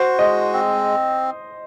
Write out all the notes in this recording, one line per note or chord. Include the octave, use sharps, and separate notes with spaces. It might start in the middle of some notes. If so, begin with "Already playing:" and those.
Already playing: F#4 C5
G#3 D#5
C4